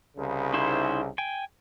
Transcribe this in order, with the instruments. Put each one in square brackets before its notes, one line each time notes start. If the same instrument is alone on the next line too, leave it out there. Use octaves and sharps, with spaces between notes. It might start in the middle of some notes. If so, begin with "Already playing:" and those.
[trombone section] C2 C#3
[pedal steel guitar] D#4 E4 C5
G5 G#5